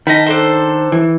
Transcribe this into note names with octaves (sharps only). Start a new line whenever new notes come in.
D#3 D#5 A5 B5
D4 A4 C5
E3